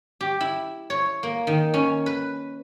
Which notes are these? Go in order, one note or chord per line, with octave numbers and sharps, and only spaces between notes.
G4
E4
C#5
A#3
D#3
C#4
B4